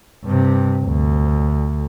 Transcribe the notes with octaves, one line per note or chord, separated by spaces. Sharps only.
G2 C3
D2